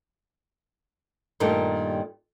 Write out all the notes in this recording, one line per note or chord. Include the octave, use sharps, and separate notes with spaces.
G2 A#2 D#3 G3 A3